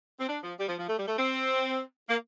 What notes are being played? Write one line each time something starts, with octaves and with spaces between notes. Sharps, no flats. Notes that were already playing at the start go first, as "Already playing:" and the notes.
C4
D4
F3
G3
F3
F3
A3
G3
A3
C4
A#3